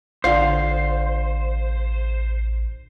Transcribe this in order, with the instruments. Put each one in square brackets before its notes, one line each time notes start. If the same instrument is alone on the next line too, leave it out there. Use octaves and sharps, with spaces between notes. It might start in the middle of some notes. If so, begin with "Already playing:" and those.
[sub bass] A1 [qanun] D3 F4 F5 [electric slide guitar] C5